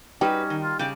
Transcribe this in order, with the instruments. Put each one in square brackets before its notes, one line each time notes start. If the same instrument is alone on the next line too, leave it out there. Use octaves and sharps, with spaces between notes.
[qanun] G3 D#4 [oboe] C#4 [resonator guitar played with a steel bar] F#4 B4 [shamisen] G4
[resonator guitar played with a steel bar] D#3
[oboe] F4
[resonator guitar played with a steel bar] C#3 [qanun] D5 A5 D6 [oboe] G5